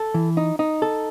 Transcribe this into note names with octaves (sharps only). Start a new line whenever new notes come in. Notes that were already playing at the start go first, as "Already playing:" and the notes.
Already playing: A4
E3
D#4
D#4
A4